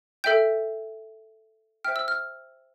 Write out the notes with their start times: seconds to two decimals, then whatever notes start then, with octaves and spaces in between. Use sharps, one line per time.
0.24 A4 E5 G5 G6
1.85 C5 E5 G5 F6
1.96 E6
2.08 F6